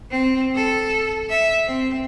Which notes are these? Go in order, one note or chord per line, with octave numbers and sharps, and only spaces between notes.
C4
A4
E5
C4